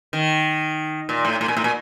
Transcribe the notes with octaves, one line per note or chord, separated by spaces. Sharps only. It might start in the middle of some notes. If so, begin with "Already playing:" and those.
D#3
A#2
A2
A2
A#2
A2
A#2